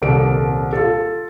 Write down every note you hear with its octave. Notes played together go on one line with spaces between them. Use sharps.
D#1 C2 A#3 A4 D7
F4 A4